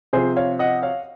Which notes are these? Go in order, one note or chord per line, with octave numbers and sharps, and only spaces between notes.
C3 F3 G#4 C5
C#5 F5
D#5 F#5
C#5 F5